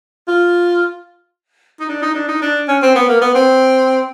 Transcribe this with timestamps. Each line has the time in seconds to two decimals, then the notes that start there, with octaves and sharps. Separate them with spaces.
0.28 F4
1.80 D#4
1.89 D4
2.02 D#4
2.15 D4
2.28 D#4
2.42 D4
2.68 C#4
2.82 C4
2.95 B3
3.09 A#3
3.21 B3
3.35 C4